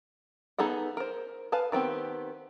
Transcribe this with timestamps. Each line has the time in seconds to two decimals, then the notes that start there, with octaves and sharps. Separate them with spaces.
0.58 B3 D#4 G#4 A4 F#5
0.97 A#4 C5
1.52 B4 F5 G#5 A5
1.72 D#3 B3 C4 G4